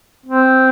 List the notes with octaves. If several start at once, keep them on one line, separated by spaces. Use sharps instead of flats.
C4